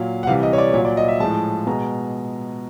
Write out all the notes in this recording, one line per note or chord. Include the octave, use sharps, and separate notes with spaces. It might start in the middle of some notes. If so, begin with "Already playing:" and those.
Already playing: A#2 F#3 F5
F#5
C3 E3 G3 F5
D#5
C#5
D5
A#2 F#3 C#5
D5
D#5
E5
A2 F3 G#3 A5
B2 G#3 A#5